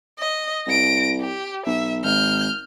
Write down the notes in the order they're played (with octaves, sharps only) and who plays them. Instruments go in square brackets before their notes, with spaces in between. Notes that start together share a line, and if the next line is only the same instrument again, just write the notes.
[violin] D#5
[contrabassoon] C2 [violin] A#6 D7
[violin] G4
[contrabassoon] B1 [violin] E5
[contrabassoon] G#1 [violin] F6 G6